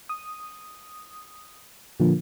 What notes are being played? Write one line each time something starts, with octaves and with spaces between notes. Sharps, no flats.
D#6
A#2 D3 F3 A#3